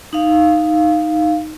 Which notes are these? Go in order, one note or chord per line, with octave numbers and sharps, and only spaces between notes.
D#4 F5